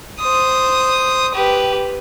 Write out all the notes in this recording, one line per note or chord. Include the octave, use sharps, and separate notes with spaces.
C5 D#6
G4 B4